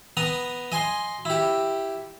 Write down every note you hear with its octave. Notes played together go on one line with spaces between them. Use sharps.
B3 A#5 D#6
D#5 G#5 C6
E4 G4